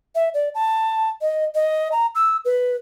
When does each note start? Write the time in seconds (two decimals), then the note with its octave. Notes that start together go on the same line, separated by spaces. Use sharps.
0.15 E5
0.34 D5
0.55 A5
1.21 D#5
1.55 D#5
1.92 A#5
2.15 E6
2.45 B4